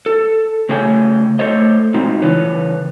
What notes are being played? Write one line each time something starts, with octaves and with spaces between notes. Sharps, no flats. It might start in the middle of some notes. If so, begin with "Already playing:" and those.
A4
C#3 A3 G#4 C#5 G5 G#5
A3 A4 C5 C#5 D#5
B2 G#3 C4 D#4 F4
C#3 E3 B4 C#5